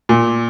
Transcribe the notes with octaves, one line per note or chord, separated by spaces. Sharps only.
A#2